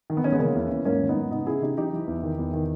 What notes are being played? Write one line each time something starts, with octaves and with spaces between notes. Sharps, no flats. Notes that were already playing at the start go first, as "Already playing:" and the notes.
D#3
B3
D#3 C#4
G#3 B3
C#3 A#3 C#4
E2
E2
G#2 A#3 C#4
D#3
B3 D#4
G#2
C#3 B3 D#4
C#3 E4 G#4
C#3 D#4 G4
E3 D#4 G4
E3
E2
D#3
E2
D#3